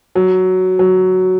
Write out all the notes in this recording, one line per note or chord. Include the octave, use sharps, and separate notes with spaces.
F#3
F#3